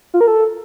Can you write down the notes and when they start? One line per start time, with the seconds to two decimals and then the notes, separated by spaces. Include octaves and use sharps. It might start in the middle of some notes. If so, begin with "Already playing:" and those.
0.14 F4
0.21 A#4
0.27 A4